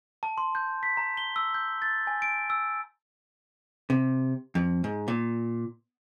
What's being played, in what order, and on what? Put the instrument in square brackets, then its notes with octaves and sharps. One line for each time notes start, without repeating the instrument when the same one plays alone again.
[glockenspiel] A5
C6
G6
B6
A#5
G7
E6
G6
A6
G#5
D7
E6
[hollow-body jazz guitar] C3
F2
G#2
A#2